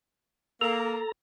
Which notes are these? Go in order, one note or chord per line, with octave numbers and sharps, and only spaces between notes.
A#3 A4 A#5